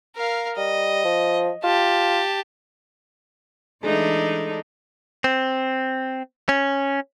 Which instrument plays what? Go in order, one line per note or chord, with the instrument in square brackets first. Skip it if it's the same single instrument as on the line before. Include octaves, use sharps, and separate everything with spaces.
[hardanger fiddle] A#4 F5
[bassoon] G3 [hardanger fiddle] D#5
[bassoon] F3
[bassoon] F4 [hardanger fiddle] G4 A5
[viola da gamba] E3 D4 D#4 [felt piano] G#3 A3
[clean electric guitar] C4
C#4